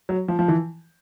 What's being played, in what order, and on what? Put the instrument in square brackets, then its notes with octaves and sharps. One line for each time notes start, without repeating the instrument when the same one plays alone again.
[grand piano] F#3
F3
F3
E3